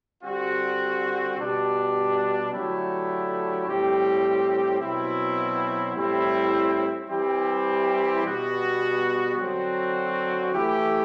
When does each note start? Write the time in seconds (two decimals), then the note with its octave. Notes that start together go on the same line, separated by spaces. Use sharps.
0.23 D3 G3 C4 F#4
1.38 B2 G3 D4 G4
2.52 D3 F#3 A3 E4 G4
3.66 A2 G3 C4 G4
4.80 B2 F#3 C4 E4
5.95 A2 G3 C4 E4
7.08 E3 G3 C4 E4 G4
8.23 B2 G3 B3 F#4
9.37 D3 F#3 C4 F#4
10.51 E3 A3 E4 G4